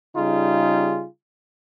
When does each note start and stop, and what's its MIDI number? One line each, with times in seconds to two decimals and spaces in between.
0.16 1.06 49
0.16 1.06 55
0.16 1.06 63
0.16 1.06 65
0.16 1.06 68